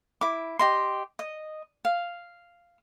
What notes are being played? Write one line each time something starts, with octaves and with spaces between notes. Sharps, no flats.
E4 D6
G4 D#5 C6
D#5
F5